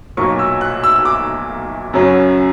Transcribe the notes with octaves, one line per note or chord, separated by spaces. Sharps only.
B1 A#2 F#3 A#3 C#6
E6
F#6
E6
D6
F#2 C#3 F#3 C#4